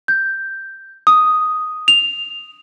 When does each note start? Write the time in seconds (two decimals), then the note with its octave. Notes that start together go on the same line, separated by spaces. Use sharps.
0.08 G6
1.07 D#6
1.88 F7